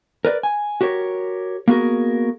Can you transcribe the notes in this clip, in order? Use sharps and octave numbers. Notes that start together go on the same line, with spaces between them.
A#4 B4 D5
G#5
F#4 G4 A#4 C#5
A#3 B3 F#4 G#4 A#4